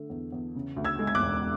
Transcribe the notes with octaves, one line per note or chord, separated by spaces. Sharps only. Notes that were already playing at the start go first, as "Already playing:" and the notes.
Already playing: D3 A3
E2
E2
C#3
D2
E6 G#6
G#3
G#6
D6 F#6
E1